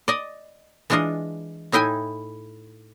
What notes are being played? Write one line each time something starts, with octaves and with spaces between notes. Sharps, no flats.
D5 D#5
E3 G#3 D4 F4 D#5
A2 D#4 E4 G5 G#5